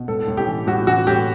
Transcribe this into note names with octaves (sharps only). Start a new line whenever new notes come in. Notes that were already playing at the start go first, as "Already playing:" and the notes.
Already playing: B2
A2 A4
A2
G4
E3
A2 F#4
E3 F#4
A2 G4